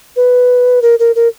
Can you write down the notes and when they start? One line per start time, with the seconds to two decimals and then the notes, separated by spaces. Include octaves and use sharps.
0.16 B4
0.82 A#4
0.99 A#4
1.16 A#4